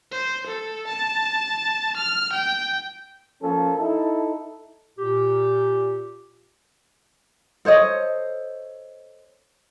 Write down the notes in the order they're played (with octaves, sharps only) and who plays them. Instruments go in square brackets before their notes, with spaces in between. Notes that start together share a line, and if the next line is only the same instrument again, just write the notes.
[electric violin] C5
A4
A5
F6
G5
[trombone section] F3 A#3 C#4 A4
D#4 E4 A4
[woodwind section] A#2 G4
[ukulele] A4 C5 C#5 D#5